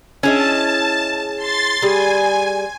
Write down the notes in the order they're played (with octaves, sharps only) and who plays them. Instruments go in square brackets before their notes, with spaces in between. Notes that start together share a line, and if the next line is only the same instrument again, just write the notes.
[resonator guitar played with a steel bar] C#4 [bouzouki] E4 G#4 D#5 [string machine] A5
[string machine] C6 A6
[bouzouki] G3 G#4 [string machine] G#5